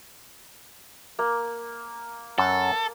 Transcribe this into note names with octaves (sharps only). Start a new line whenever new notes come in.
A#3
F#2 A4